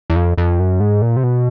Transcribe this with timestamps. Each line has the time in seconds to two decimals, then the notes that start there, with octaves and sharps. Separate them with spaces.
0.10 E2
0.16 F2
0.38 F2
0.59 F#2
0.80 G#2
1.02 A#2
1.17 C3
1.24 B2